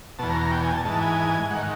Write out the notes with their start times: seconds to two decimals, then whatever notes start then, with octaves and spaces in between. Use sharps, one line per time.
0.19 E2 B2 A5
0.30 A#5
0.41 A#5
0.52 G5
0.63 G#5
0.73 A5
0.85 G#2 E3 A5
1.01 G#5
1.50 G#2 D#3 F#5